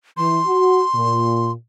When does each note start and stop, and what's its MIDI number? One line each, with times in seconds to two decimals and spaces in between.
0.17 0.41 52
0.17 1.52 84
0.46 0.83 66
0.95 1.53 46